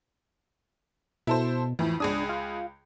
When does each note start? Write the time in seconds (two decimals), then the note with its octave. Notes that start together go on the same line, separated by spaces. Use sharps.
1.27 B2 E4 A4 C5
1.79 F2 A2 E3
2.00 C#2 D4 G#4 D#6
2.29 F4